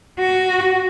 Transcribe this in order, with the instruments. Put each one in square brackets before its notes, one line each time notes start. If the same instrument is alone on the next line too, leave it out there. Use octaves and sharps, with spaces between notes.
[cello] F#4